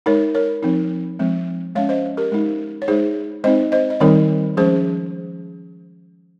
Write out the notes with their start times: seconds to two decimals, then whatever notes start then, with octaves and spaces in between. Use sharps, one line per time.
0.06 G#3 D#4 A#4 C#5
0.35 A#4 C#5
0.63 F3 C4 D#4
1.19 F3 G#3 C4
1.75 G#3 C#4 C#5 F5
1.89 C5 D#5
2.17 G4 A#4
2.32 G#3 D#4
2.82 C#5
2.88 G#3 D#4 G#4 C5
3.44 G#3 C4 D#4 C5 D#5
3.72 C5 D#5
3.90 D#5
4.00 D#3 G3 C4 D#4 A#4 C#5
4.57 F3 G#3 C#4 G#4 C5